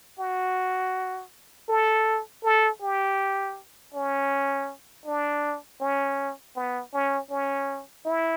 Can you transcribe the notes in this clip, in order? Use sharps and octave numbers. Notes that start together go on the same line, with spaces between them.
F#4
A4
A4
G4
C#4
D4
C#4
B3
C#4
C#4
E4